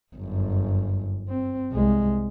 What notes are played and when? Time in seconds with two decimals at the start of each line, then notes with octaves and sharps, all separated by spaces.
0.15 G1 F#2
1.29 C4
1.71 C2 G#3